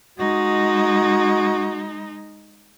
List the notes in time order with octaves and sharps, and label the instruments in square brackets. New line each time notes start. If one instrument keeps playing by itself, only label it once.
[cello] G#3 D#4 [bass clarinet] F#4